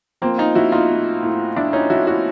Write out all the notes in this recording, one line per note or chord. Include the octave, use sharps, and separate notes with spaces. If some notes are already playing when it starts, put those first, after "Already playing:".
F3 A#3 C4
D#4 F4
F3 E4 F#4
D#4 F4
A2
A2
F3 D4 E4
C#4 D#4
F3 E4 F#4
E4 F#4